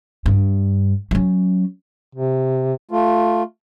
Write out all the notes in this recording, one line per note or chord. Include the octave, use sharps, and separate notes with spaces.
G2
F#3 C#4
C3
A3 F4